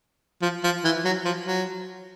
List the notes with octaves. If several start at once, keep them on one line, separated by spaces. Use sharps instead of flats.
F3
F3
E3
F#3
F3
F#3